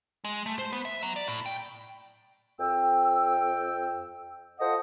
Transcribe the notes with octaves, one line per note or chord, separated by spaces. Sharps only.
G#3
A3
C5
B3
E5
F#3
D5
A2
G5
F2 G5 E6
F4 A4 C5 D#5 F#5 D#6